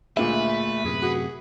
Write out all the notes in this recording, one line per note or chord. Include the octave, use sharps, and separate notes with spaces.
D2 A#2 G#3 A3 G#4 B4 E5
F#2 A2 C3 G#4
F#4 G#4